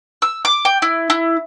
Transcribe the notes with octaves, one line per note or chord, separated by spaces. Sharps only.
E6
D6
G5
E4
E4